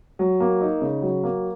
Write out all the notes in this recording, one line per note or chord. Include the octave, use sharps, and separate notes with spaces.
F#3
A#3
D#4
C#3
F#3
A#3